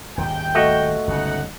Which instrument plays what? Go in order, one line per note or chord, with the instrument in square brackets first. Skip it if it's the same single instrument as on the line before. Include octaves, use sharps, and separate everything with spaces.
[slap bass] D#1 G#2 [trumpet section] G5
[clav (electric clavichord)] A3 F#4 D#5
[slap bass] G1 C#2 [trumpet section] D#4 F#5